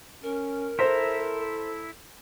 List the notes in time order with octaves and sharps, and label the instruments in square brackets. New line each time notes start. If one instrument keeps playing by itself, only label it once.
[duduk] C#4 [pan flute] A#4
[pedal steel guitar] E4 E5 A#5 [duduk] A4 [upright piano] C5